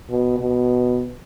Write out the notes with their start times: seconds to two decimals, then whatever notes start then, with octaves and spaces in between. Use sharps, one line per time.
0.10 B2
0.40 B2